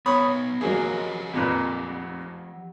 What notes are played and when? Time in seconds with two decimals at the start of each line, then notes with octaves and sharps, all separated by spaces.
0.06 B3 D#4 C#5 B5 D#6
0.61 F3 F#3 A#3 G4 G#4 D#5
1.34 F2 A#2 B4